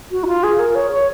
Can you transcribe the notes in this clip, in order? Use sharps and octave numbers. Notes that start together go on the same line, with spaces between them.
F#4
D#4
F4
G#4
A#4
C#5
C#5